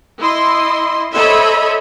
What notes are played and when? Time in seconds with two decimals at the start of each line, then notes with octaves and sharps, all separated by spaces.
0.18 E4 D#5 C6
1.13 A4 C5 C#5 D#5 E5 B5